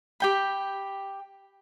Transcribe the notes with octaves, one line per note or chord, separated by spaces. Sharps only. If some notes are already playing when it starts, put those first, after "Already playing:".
G4 G5 B5